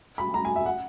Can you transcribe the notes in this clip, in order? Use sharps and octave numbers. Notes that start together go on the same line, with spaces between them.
B5
A#5
G#5
E5
F#5